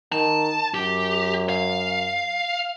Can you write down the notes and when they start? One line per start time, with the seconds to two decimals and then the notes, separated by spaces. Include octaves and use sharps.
0.12 D#3 A5
0.74 F#2 G4
1.49 F5